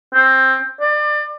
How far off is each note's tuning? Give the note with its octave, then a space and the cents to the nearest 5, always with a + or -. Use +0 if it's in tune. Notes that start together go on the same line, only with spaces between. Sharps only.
C4 +10
D5 +30